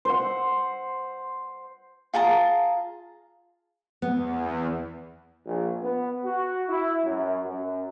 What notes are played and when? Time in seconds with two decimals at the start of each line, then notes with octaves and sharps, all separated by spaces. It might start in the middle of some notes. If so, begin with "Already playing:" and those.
0.05 C5 F#5
2.14 F4 G#4 A5 A#5
4.02 E2 B3
5.46 A#1
5.81 B3
6.24 F#4
6.69 E4
7.04 F#2
7.43 F#2